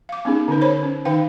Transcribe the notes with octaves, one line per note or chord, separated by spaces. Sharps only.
F5 D6
B3 C#4 D#4 G#4
D3 C#4 D#4 B4
C5 C#5 B5
C#4
D#3 D#4 B4 F5 G5